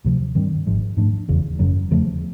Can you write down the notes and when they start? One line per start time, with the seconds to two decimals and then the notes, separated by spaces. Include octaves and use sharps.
0.04 D2 C3 F3
0.35 G2 D#3 G3 C4
0.67 G#1 G#2 F3
0.97 G#2 F3 A3 D4
1.28 F1 E2 C#3
1.59 F#1 F#2 C#3 F#3
1.91 E2 C#3 F3 A3